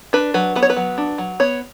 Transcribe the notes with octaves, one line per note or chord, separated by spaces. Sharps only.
D4 B4
F#3 B4
B3 B4
C#5
B4
F#3
D4
F#3
B3 C#5